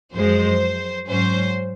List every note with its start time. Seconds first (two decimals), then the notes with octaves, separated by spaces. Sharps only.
0.14 F#2 F3 G#3 C5
1.07 G#2 F#3 C#4 C5